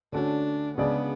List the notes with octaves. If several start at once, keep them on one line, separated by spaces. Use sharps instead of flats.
D3 A3 C#4 D4 F#4
C#3 G#3 B3 D4 G#4 D5